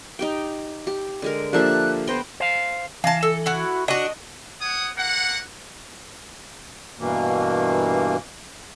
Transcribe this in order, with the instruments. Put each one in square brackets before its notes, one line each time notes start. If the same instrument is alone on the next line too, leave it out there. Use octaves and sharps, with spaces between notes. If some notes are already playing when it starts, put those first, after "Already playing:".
[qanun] D#4 G4 G5
G4
D3 G#3 A#4
[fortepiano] F3 A#3 D4 [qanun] G4 A4 E5 [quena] F#6
[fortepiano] B3 [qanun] B4 G5 A#5 [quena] C5
[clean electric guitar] C5 F5
[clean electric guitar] E3 [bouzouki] F5 A5
[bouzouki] A4
E4 F#4
[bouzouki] D4 F#4 [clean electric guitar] D#5
[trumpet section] C#5 F#5 D#6
A#3 F#5
[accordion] G2 B2 E3 A#3